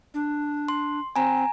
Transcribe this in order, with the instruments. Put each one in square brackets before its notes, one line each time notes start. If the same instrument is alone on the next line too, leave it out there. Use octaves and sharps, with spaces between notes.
[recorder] D4
[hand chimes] C6
[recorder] C4 [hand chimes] G#5 A#5